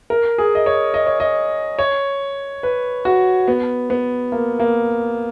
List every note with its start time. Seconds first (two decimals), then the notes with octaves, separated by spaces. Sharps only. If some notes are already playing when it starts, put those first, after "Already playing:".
0.10 A#4
0.38 G#4
0.55 D#5
0.66 C#5
0.94 D#5
1.06 C#5
1.20 D#5
1.79 C#5
2.63 B4
3.05 F#4
3.48 B3
3.90 B3
4.32 A#3
4.60 A#3